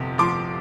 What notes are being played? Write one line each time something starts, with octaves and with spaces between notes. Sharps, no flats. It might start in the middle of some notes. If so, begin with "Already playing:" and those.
Already playing: G1 F2 C3
F3 C6 D6